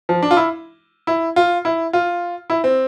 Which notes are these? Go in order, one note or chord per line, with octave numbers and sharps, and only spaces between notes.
F3
D4
F4
E4
E4
F4
E4
F4
E4
C4